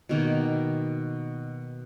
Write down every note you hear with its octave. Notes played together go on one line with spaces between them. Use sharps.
B2 D#3 A#3